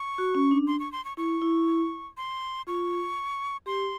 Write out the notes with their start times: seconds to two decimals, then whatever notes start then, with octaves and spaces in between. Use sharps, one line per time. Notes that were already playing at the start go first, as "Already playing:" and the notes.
Already playing: C#6
0.18 F#4
0.35 C#4
0.51 D4
0.67 C6
0.80 C#6
0.92 C6
1.05 C#6
1.17 E4 C#6
1.42 E4
2.17 C6
2.67 F4 C#6
3.66 G4 C6